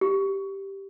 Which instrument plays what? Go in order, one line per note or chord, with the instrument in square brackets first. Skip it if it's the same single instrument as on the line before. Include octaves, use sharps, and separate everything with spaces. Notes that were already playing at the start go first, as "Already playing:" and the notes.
[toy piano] G4